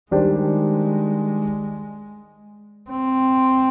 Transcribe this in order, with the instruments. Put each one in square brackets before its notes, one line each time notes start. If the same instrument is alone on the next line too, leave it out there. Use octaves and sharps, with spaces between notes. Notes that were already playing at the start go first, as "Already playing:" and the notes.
[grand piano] D#3 G3 D4 G4 C5 [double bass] G#3
[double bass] C4